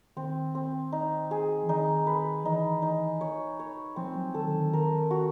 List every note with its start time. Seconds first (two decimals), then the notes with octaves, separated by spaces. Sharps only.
0.17 D#3 C4
0.55 C4
0.92 D#4
1.31 G#4
1.63 E3
1.69 D#3 D#4
2.07 B4
2.45 E3 D#4
2.82 D#4
3.21 C#5
3.59 C#5
3.96 F3 C4
4.15 F#3
4.34 D#3 A4
4.47 D3
4.54 D#3
4.73 D#3 A#4
5.11 F#4